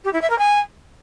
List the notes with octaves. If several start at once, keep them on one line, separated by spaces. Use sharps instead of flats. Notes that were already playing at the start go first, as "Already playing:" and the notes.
G4
E4
E5
A#4
G#5